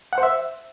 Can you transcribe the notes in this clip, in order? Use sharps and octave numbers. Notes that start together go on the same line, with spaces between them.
F#5
C5
E5